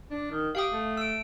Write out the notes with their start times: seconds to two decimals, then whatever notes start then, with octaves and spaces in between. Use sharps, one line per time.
0.10 D4
0.31 D#3
0.55 G4 F5 G5 D#6
0.72 A3
0.97 E6 D7